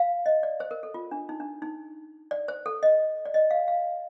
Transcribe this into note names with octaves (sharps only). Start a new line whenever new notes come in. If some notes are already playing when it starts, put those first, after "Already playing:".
Already playing: F5
D#5
D5
C5
A#4
A4
F4
D4
D#4
D4
D#4
D5
C5
A4
D#5
D5
D#5
F5
F5